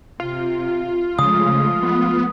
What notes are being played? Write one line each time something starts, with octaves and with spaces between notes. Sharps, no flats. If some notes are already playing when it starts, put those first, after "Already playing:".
C3 F4
C#3 F3 G#3 A3 D#6
B3